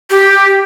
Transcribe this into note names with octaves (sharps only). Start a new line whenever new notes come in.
G4